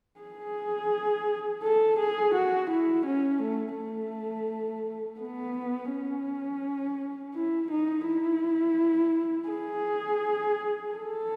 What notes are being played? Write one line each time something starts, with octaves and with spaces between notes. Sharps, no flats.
G#4
A4
G#4
F#4
E4
C#4
A3
A3
B3
C#4
E4
D#4
E4
G#4
A4